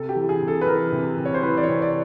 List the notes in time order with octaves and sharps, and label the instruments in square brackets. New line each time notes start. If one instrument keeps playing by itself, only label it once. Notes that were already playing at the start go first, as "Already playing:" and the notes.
Already playing: [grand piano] C3 A4
G4
E3
G#4
C3
A4
B4
E3 A#4
C3
C3
C#5
C5
E3 B4
D5
C#5
C3
D5